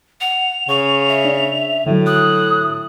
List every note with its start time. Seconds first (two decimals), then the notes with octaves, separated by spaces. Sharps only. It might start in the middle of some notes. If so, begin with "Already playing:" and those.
0.21 F#5 F7
0.69 C#3 C#6
1.08 E5
1.25 D4
1.86 A2 D3 F#3
2.06 D#6 F#6